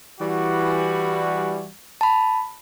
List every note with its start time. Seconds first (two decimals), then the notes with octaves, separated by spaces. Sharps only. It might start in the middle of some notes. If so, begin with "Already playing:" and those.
0.20 E3 G3 F#4
2.01 A5 B5